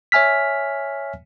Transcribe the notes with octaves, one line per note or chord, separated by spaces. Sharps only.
C#5 E5 G#5 F6 B6